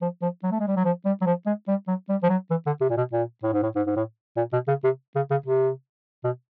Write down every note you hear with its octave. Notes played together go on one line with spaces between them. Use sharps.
F3
F3
F#3
A3
G#3
G3
F#3
F3
G3
F#3
F3
G#3
G3
F#3
G3
F3
F#3
E3
D3
C3
A#2
B2
A#2
A2
G#2
A2
G#2
G#2
A2
A#2
B2
C#3
C3
C#3
C#3
C3
B2